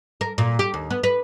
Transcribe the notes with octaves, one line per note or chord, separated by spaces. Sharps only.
A#4
A#2
G4
D#2
B3
B4